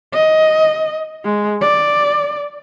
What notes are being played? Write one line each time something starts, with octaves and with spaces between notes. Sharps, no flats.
D#5
G#3
D5